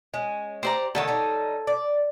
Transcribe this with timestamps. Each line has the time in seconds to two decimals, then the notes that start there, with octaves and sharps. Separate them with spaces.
0.14 G#3 C#4
0.63 G4 C5 D5 A#5
0.95 D3 D#3 D#4 A4 C#5 A5
1.08 G3 D#4
1.67 D5